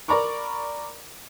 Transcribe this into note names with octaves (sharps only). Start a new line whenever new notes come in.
A#4 D5 A#5 B5 C#6 D6